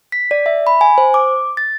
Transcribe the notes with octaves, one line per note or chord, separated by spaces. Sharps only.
B6
D5
E5
B5
G#5
C5
D6
A6